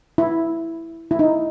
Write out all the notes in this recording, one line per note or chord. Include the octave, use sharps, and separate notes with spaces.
E4
E4
D#4